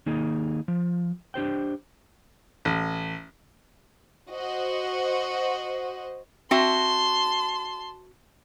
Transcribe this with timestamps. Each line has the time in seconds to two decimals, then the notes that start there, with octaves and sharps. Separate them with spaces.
0.06 D#3 A#3 D#4 G#4
0.68 F3
1.34 D4 G4 C5 G5
2.65 A1
4.32 F#4 C5 D#5
6.51 C4 F#4 E5 A5 C6